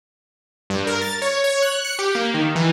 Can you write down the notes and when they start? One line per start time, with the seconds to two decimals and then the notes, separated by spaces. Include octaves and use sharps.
0.70 G2
0.87 A#4
1.02 A6
1.22 C#5
1.44 C#5
1.62 F#6
1.85 C#7
1.99 G4
2.15 A#3
2.34 D#3
2.55 E3